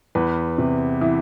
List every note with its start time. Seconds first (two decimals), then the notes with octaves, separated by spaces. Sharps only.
0.15 E2 B4
0.58 C3
1.01 E3